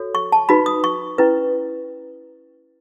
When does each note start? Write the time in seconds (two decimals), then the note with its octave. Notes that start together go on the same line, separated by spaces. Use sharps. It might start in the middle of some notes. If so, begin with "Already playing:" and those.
Already playing: F#4 A4 C#5
0.15 C#6
0.32 A5
0.49 D#4 F#4 B4 B5
0.66 D#6
0.84 C#6
1.18 C#4 E4 B4